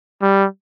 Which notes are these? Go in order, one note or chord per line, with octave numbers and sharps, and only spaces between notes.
G3